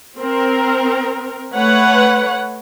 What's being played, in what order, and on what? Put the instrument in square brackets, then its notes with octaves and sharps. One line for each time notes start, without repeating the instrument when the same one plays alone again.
[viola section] C4 A#4
A3 B4 C#5 F#5